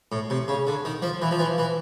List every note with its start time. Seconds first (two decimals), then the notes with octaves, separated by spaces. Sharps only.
0.12 A2
0.30 C3
0.48 C#3
0.67 D3
0.85 D#3
1.02 F3
1.22 E3
1.31 F3
1.39 E3
1.58 E3